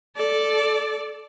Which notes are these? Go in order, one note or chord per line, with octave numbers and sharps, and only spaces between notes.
A4 D5